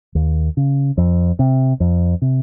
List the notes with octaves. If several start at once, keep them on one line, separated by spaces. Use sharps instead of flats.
D#2
C#3
F2
C3
F2
C3